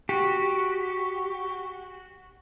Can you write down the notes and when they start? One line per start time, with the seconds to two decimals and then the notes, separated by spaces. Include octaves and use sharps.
0.09 F#4 G4